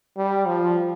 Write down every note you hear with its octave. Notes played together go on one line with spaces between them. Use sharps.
G3
F3